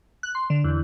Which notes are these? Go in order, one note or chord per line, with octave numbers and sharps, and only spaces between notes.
F#6
C6
D3
E2